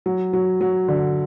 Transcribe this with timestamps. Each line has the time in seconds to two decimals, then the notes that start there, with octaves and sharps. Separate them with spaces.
0.06 F#3
0.33 F#3
0.61 F#3
0.88 D3